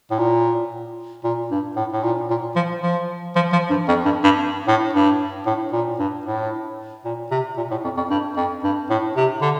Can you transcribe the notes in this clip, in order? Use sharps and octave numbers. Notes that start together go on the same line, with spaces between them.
A2
A#2
A#2
G2
A2
A2
A#2
A#2
F3
F3
F3
F3
G2
F2
G2
G2
A2
G2
A2
A#2
G2
A2
A#2
C3
A#2
A2
F2
F2
G2
F2
G2
A2
C3
D3